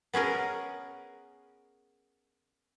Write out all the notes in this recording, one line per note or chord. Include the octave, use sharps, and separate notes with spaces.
B3 C#4 G#4 A#4